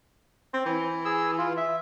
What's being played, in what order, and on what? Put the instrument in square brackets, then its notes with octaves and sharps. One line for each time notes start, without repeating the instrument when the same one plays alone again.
[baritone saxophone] C4
E3
[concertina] G#4 E6
F4
E5